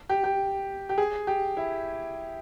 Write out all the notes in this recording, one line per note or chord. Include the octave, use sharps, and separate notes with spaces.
G4
G4
G4
G#4
G4
E4